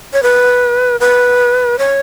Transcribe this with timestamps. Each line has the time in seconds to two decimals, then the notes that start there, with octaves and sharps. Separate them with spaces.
0.13 C#5
0.23 B4
1.00 B4
1.78 C#5